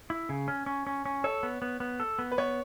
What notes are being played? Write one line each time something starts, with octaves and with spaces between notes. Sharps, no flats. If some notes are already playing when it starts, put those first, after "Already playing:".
E4
C#3
C#4
C#4
C#4
C#4
A4 C#5
B3
B3
B3
A4
B3
B4
B3 C#5